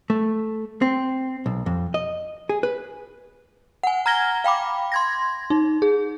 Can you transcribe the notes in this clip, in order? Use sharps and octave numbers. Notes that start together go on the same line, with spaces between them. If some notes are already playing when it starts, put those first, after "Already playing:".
A3
C4
B1
F2
D#5
G#4
B4
F#5 G#5
A#5 F6 G#6 A#6 G7
F5 G5 B5 D6
C6 G#6 A#6
D#4
G#4